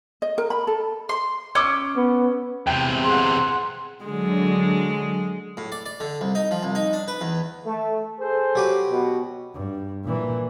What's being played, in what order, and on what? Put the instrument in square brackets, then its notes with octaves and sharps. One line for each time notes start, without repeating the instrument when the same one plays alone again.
[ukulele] D#5
A#4
B5
A4
[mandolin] C6
[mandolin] C#4 [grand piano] D6 E6 G#6
[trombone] B3
[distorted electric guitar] E2 C3 [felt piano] G5
[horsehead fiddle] G#4 F#5 [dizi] C6
[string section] D3 F#3 [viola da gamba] G#3
[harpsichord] A2
D5
D5
D3
C2
D#4
F3
C2
D#4
D4
B4
E2
[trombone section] A3
G#4 A4 C5
[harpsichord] F#3 G4 B4
[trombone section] B2
[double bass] G2
A#2 E3